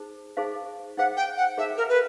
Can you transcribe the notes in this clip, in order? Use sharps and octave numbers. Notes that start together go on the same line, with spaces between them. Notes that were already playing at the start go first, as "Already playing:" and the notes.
Already playing: D#4 G#4 C5
D#4 G#4 C5 F5
D#4 G#4 C5 F5 F#5
G5
F#5
D#4 G#4 C5 E5 F5
A#4
B4